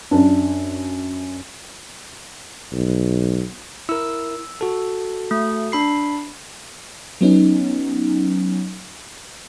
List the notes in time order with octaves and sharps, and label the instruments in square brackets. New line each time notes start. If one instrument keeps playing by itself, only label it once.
[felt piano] F#2 D4
[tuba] B1
[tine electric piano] E4 A#4 [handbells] E6
[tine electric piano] F#4 A4
[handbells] A3
D4 B5 C7
[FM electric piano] F#3 B3 C#4 D#4